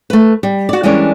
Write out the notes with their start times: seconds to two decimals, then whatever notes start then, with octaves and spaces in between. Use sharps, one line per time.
0.10 A3 B4
0.43 G3
0.69 F#4 D5
0.83 E3 G3 G#3 C#4 D4 A#4